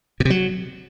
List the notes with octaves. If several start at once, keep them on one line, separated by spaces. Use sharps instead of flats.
B2
C3
F#3